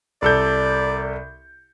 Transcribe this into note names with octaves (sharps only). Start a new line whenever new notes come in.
C2 A4 D5 G6